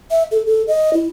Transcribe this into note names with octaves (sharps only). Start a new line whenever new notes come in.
E5
A4
A4
D#5
E4